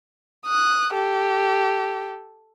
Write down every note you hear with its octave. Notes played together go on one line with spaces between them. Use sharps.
D#6 F#6
G4 A4